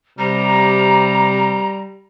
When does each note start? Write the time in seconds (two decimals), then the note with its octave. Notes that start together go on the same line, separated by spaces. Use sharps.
0.19 C3 G3 A#5